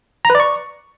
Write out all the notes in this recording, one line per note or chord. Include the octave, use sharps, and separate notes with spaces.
A#5
B4
D5
C#6